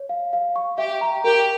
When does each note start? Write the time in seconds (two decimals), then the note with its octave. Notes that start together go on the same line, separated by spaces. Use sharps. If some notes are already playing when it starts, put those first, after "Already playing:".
Already playing: C#5
0.09 F5
0.33 F5
0.56 C#6
0.78 G4 E5
1.01 A#5
1.24 G4 A#4